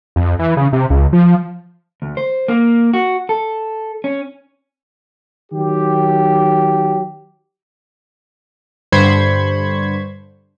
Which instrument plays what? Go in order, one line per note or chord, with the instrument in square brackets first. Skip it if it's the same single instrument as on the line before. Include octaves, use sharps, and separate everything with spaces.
[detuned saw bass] F2
E3
C#3
C3
C#2
F3
[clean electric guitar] D2
C5
A#3
F#4
A4
C#4
[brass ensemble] D#3 F#3 G4
[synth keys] G2 D3 C5 B5 C#6 G#6